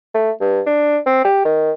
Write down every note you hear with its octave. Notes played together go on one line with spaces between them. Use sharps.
A3
G2
D4
C4
G4
D#3